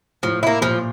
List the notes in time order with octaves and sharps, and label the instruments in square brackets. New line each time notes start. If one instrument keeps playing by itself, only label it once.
[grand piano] A2 [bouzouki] F3
[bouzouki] A#3 E4
[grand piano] A#2 [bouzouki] F3